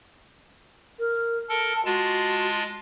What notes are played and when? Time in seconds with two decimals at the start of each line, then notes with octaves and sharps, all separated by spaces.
0.99 A#4
1.49 A4 A#4 A5
1.85 G#3 F4 F#4 A5